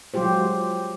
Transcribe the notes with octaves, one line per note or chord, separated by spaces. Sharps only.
F#3 G#3 F4 G4 C5